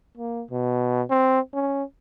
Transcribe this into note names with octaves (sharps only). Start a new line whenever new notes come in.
A#3
B2
C4
C#4